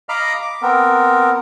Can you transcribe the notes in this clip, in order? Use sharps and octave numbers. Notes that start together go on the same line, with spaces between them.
D#5 F5 A#5 B5 D6 F6
D6
B3 C4 A#4